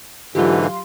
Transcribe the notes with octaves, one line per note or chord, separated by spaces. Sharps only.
G#2 D3 E3 F#3 F4 G4
F5 C6